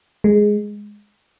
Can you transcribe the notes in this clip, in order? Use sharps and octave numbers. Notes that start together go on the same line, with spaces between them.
G#3